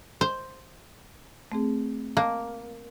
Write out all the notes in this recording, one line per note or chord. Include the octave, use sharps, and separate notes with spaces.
C5
A3 C4 G#4
A#3 A5